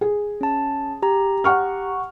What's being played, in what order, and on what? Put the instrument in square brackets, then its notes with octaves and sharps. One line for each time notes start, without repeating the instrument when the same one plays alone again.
[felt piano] G#4
[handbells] C#4 A5
G4 A#5
[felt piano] F#5 C#6 F6